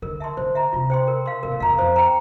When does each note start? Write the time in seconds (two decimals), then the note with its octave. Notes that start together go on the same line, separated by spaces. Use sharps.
0.02 D3 A#4
0.20 E5 A5 C6
0.37 D3 C5
0.55 E5 A#5
0.73 C3 F4
0.90 C5 G5 C6
1.08 A#4
1.26 F5 C6
1.43 C3 A#4
1.51 A#2
1.60 F2 F5 A#5
1.70 E2
1.78 F2 C5
1.96 G5 A#5